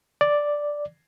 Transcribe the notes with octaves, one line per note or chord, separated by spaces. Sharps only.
D5